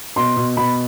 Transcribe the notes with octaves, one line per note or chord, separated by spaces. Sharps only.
B2 C6
B2
B2 B5